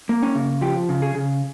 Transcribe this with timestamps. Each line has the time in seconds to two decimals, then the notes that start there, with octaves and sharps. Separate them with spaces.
0.09 A#3
0.23 C#4
0.35 C#3
0.61 F3 G4
0.89 C#3
1.02 G#4
1.15 C#3